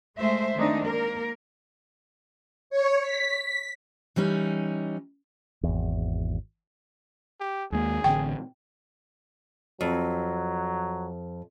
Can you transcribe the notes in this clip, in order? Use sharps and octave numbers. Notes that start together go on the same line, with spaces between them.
G#3 A3 C5 E5
D#3 G#3 A3 C4 D4 D#4
A#3 A#4
C#5
B6
E3 G3 C#4 D#4
G#1 E2
G4
D#2 G#3 A#3 G#4
A1 D3 C4 G5
F2 F#3